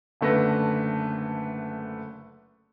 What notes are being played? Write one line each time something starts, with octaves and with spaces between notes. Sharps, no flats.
F#1 D3 A3 B4 A#6